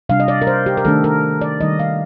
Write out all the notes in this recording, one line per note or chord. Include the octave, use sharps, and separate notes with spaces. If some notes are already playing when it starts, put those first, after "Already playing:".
C3 G3 D4 F5
D#5
D5
A#4
C5
G4
A#4
D#3 A3 D4 A4
A#4
D5
D#3 G3 A#3 D#4 D#5
F5